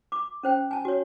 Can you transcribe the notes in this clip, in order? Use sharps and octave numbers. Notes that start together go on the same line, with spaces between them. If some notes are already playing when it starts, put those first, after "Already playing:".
D6
C#4 C5 G5
G#5 A5
F#4 C#5